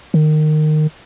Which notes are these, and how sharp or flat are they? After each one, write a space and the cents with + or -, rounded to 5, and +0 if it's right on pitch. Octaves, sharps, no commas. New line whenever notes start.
D#3 -20